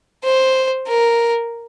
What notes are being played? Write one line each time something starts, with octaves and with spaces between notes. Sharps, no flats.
C5
A#4